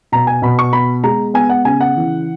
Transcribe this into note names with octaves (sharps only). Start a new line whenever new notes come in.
B2 A#5
G#5
B2 B5
C#6
B3 B5
G#3 A#5
B3 G#5
F#5
C#3 G#5
F#5
E3